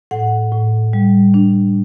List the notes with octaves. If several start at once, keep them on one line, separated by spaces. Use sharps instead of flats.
A2 F#5
A2
G3
D4